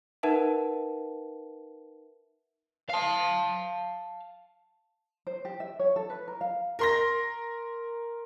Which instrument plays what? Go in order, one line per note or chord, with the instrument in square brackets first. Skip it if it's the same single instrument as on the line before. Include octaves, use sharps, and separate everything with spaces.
[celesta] D#4 A#4 B4 E5 F#5 A5
[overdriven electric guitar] F5 A5
[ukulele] C5
G4
E5
C#5
A4
B4
A#4
F5
[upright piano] A#4 C6 A#6